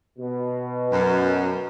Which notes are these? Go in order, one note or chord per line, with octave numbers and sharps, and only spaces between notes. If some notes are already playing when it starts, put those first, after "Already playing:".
B2
F#2